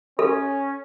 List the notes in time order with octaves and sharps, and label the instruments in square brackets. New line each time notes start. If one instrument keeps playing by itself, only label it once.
[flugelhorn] C#4 [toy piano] A4